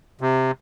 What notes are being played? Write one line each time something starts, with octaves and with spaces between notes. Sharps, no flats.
C3